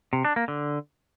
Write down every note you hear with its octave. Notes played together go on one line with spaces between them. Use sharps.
C3
D4
A#3
D3